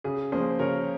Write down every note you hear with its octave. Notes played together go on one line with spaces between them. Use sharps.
C#3 G#4
F3 A#3 C#4 G#4 C5
C#3 A#4 C#5